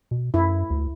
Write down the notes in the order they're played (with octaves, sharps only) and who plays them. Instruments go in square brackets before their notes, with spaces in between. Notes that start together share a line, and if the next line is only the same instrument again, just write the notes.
[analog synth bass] B2
[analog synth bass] F#2 [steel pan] E4
[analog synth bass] D2